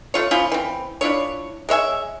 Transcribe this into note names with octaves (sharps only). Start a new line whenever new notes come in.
A3 F4 C#5
F3 C#4 E4 F4
E3 C4
D4 E4 F4 C#5
G#3 C#5 E5 G#5